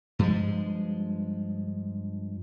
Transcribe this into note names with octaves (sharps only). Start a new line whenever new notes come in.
G2 F3 G#3